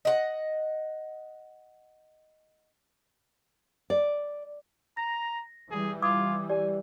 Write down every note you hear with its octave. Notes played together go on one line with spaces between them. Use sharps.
D#5 F#5
D5
A#5 A#6
E3 G3 G#4
F4 D6 D#6 G#6
G4 D5 G#5